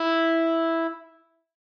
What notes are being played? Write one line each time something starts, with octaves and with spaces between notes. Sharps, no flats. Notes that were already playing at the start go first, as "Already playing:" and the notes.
Already playing: E4